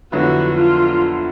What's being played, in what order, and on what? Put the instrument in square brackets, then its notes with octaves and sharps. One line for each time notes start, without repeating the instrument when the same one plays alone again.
[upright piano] F2 D3 F#3 B3 E4 [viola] F#4
[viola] F4